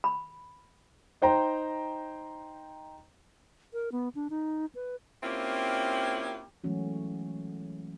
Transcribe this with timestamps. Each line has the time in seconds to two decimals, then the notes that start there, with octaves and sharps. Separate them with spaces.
0.04 B5
1.22 D#4 C5 G5 A#5
3.73 A#4
3.92 B3
4.15 D4
4.30 D#4
4.75 B4
5.23 A#3 C4 C#4 E4 F4 G4
6.64 E3 F#3 G#3 A3 C#4 F#4